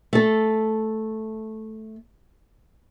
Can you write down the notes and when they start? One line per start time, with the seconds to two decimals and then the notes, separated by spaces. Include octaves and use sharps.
0.13 A3 A4